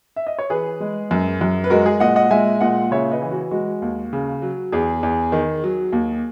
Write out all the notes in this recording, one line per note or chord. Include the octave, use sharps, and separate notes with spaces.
E5
D#5
C#5
E3 G#4 B4
G#3
F#2
F#2
B4
G#3 F#4 A#4
G#4
A#2 D#5 F#5
D#5 F#5
G#3 E5 G#5
A#2 D#5 F#5
C#3 C#5 E5
B4 D#5
E3
F#4
G#3 F#4
D#2
C#3
F#3
E2 G#4
E2
D#3
F#3
D#2